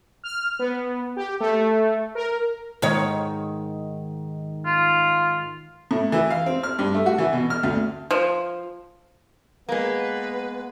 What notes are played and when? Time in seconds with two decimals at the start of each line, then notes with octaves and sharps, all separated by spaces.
0.24 F6
0.59 B3
1.16 G4
1.40 A3
2.15 A#4
2.82 G#2 D#3 C#5
4.66 F4
5.91 A2
6.12 E3
6.30 F5
6.46 C4
6.63 F6
6.79 G2
6.94 A3
7.06 F#4
7.18 E3
7.33 B2
7.50 F6
7.63 D2
8.11 F3
9.69 G#3 A#3 B3 B4